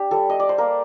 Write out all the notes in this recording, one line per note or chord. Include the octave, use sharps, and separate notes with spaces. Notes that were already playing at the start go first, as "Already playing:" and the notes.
Already playing: D4 G4
G3 A4
D#5
D5
C5
A#3 A#4